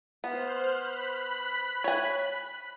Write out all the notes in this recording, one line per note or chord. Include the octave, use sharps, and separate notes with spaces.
B3 C5 F6 F#6
B5 F#6 B6
C#5 G#5